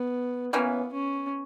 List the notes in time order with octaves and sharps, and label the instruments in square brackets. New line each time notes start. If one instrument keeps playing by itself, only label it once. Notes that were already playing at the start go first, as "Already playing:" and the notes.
Already playing: [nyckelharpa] B3
[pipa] E3 A#3 C#4 [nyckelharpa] B3
[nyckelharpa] C#4